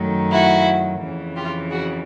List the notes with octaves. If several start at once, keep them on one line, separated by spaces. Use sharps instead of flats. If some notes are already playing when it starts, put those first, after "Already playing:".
Already playing: F#2 D#3 F#3 A3
E4 F#4
F2 C#3 E3
F4 G4
F#4 G#4